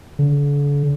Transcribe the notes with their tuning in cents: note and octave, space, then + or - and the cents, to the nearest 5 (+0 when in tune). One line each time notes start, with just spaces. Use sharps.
D3 -40